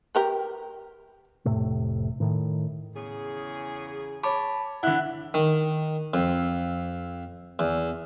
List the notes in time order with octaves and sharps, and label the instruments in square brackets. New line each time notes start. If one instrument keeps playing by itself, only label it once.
[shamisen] G4 A#4 B4
[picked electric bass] F1 A2 C3 A3
A2 D#3
[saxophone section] E2 C#3 G#4
[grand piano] C#5 [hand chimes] A5 B5 D6
[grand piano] D3 E4 [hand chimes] F#5 F#6
[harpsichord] D#3
F2
E2